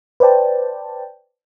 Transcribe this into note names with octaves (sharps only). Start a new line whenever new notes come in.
B4 C5 D5 G5 A5